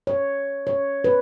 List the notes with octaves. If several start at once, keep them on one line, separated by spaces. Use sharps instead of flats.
C#5
C#5
B4